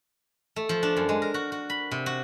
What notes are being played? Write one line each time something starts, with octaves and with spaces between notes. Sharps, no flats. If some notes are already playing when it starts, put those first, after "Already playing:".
A3
F3
D4
F#2
G#3
A#4
F#4
F#4
B5
C3
F#4